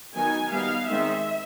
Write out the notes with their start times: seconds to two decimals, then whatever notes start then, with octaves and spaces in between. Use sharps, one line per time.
0.16 D#3 F#3 B3 D#4 G#5
0.52 G3 B3 D#4 F5
0.88 D#3 G#3 C4 D#4 E5